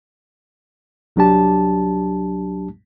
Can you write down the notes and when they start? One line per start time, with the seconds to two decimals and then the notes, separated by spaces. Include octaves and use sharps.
1.16 C2 F#3 D4 G4 A5